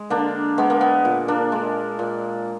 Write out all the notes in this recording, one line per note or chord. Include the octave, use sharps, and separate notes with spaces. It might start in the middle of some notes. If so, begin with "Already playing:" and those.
Already playing: G#3
D3 A#3 D4
G#3 B3
A#3
B3
A#2
A#3 D4
G#3
A#2